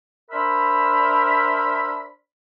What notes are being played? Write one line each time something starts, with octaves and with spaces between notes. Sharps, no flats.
D4 A#4 C5 E5 B5